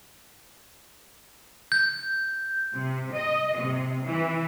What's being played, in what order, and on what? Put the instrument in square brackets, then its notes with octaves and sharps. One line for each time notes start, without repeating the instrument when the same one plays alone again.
[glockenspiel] G6
[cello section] C3
D#5
C3
E3